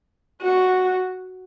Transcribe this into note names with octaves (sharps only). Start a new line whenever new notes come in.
F#4